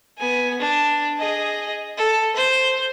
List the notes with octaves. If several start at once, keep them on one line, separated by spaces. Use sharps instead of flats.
B3 G#5
D4
G#4 D#5
A4
C5